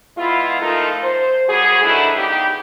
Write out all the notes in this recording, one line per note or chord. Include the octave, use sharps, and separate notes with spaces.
G#3 B3 E4 F4
F3 A3 D#4 F4 A4 A#4
C5
F#2 G3 F#4 G#4
D3 D#3 F#3 A3 D4 E4
C#3 B3 D#4 G4